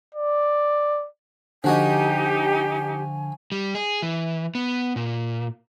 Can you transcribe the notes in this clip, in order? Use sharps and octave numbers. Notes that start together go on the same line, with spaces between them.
D5
D3 F3 D#4 F#4 G4 D#5 G#5
G3
G#4
E3
B3
A#2